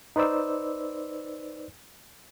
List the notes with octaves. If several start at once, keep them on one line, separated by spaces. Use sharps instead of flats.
D#4 B4 C5 D5 E6